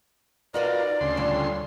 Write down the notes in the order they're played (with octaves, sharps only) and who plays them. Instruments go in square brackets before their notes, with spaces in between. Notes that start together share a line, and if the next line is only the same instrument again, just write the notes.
[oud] D#4 F#4 B4 [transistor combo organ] F4 A#4 [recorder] D5
[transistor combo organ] D2 C#3 C6
[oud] G3 F4 A4